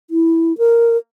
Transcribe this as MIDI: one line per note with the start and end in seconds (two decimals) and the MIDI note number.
0.10 0.56 64
0.58 0.97 70